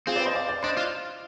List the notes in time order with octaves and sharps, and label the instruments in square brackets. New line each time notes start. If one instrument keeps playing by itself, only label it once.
[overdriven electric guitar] C4 [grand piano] F4 G#4
[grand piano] B4 D5
C5 D#5
D5 F5
D5 F5
[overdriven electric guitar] D4 [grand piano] C5 D#5
[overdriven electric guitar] F4